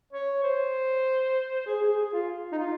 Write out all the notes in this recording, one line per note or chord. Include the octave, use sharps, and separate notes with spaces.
C#5
C5
G#4
G#4
G#4
F4
D#4
F4